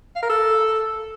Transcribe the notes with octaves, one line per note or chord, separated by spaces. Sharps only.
F5
A#4
A4